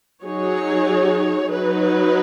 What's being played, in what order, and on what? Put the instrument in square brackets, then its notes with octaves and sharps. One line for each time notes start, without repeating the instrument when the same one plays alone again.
[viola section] F#3 D#4 G#4 C#5
F#3 D#4 B4